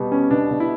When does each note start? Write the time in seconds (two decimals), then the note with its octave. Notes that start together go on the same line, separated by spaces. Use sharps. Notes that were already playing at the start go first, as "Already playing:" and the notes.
Already playing: B2 G3
0.11 B3 C#4
0.31 B2 D4
0.51 B2
0.60 E4